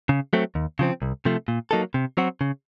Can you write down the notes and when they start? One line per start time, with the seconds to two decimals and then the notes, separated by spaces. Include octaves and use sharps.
0.09 C#3
0.33 F#3 A3 C4
0.55 D#2
0.79 C#3 F3 C4
1.02 C2
1.25 C3 F3 A3
1.48 A#2
1.71 F#3 A#3 D#4 A4
1.94 C3
2.17 F#3 C4 F#4
2.41 C#3